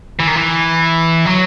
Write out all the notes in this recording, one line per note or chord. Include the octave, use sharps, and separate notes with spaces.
E3
D#3
E3
F#3